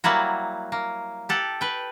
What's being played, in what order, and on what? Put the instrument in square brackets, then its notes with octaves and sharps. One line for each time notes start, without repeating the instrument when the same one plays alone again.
[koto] F#3 G3 A#3 E4 F#4
A#3
G4 A4 F#5
B4 G5